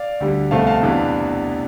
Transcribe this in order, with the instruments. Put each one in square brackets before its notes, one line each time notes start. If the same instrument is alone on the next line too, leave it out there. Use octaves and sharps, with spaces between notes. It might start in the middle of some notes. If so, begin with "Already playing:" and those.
Already playing: [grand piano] D5 F5
D2 D3 G3
C2 B2 A3 C4 F5 A5
F5 A5
E2 C3 E3 B3 D4